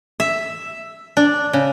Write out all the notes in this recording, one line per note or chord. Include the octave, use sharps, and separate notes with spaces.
E5
D4
C#3